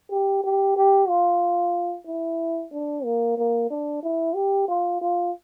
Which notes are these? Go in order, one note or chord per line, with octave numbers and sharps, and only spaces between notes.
G4
G4
G4
F4
E4
D4
A#3
A#3
D4
E4
G4
F4
F4